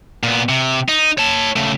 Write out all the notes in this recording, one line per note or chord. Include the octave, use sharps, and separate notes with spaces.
A#2 B3
C3
D#4
C#5 A5
C#3 A3